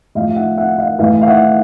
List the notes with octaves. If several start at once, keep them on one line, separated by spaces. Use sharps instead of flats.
A2 F3 D#5 F5
F5
E5 F#5
E5 F#5
D#5 F5
A2 E3 D#5 F5
F5
E5 F#5